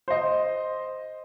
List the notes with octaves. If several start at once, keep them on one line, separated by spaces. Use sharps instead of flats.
C5 D#5